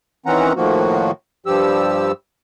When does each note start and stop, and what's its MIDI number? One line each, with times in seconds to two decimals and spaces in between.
0.26 0.53 51
0.26 0.53 52
0.26 0.53 60
0.26 0.53 61
0.26 0.53 78
0.26 0.53 82
0.56 1.11 45
0.56 1.11 51
0.56 1.11 53
0.56 1.11 58
0.56 1.11 66
1.46 2.12 43
1.46 2.12 53
1.46 2.12 55
1.46 2.12 67
1.46 2.12 88